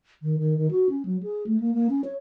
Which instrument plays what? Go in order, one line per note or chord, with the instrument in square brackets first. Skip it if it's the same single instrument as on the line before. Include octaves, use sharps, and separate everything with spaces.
[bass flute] D#3
D#3
D#3
F#4
C#4
F#3
G#4
A3
A#3
A#3
C#4
C#5